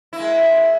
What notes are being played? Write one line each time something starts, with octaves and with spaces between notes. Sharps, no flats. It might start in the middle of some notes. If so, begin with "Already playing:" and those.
G#3 A#3 E4